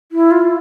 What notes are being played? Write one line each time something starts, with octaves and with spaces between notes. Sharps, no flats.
E4
F4